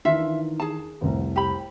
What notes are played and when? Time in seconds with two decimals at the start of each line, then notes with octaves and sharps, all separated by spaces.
0.05 D#3 E3 D4 F4 E5
0.60 G#4 A5
1.01 F1 C2
1.36 G4 B5